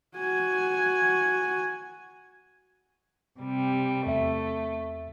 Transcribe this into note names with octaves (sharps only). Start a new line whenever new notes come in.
F#4 G#5
C3 G3
E2 A3 E5